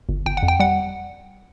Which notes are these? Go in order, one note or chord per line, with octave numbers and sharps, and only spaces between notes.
G1
G1 G5
F#5
F2
G5
G3 F#5